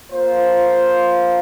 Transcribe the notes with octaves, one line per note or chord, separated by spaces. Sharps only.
A#3 F4 C5